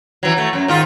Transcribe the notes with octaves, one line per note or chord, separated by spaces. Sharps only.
E3 F#3
F#3 A3
F#2 F#3
G#2 D#3 F4